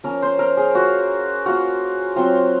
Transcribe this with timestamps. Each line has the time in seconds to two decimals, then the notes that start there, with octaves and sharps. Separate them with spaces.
0.04 F3 A#3 C#4 A#4
0.22 C5
0.39 A#4
0.57 G#4
0.75 A#3 F4 F#4
1.46 A#3 F4 F#4
2.16 F#3 C4 F4